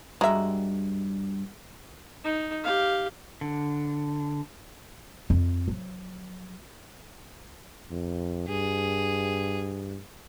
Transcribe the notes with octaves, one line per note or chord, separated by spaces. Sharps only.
G2 G#3 F#4 E5 A#5
D#4
G4 F5
D3
F2
F3 F#3
F2
G2 G#4